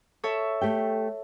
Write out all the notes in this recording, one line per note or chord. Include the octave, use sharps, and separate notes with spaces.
A4 C#5 E5
A3 G4 G5